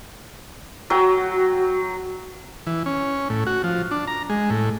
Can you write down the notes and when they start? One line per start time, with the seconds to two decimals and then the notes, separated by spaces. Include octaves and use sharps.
0.90 F#3 F#4 G5
2.67 E3
2.86 C#4
3.30 A2
3.47 F#4
3.64 F3
3.91 D4
4.07 A#5
4.30 G#3
4.50 A2